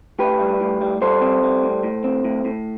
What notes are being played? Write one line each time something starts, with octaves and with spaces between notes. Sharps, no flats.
A2 G4 B4
G3
A2
G3
G3 A4 C5
C4
G3
A2
A2
C4
A2
A2